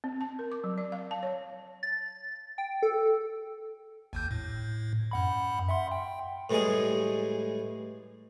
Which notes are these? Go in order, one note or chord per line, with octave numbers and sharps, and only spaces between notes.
C4
A5
A#4
D6
F#3
D5
F5
A5
C#5
A6
G5
A4
G#1 D#2 G6
A2
F#2 F#5 B5
E5 F#5 C6
G5
A2 E3 G3 G#3 G#4